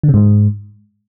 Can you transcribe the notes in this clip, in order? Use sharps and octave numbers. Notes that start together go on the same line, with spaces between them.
D3
C3
G#2